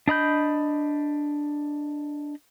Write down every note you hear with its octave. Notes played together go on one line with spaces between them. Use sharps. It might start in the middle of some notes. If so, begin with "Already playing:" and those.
D4 D#5 B5 G6